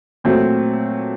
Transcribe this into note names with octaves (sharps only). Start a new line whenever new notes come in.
A#2 F#3 A3 C4